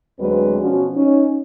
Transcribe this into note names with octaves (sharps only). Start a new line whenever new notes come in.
D2 F#3 G#3 C4 D4 B4
B2 F3 C#4 F#4
C#4 D#4